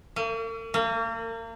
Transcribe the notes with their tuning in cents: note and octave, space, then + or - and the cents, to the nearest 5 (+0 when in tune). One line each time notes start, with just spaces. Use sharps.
A#3 -45
A#3 -35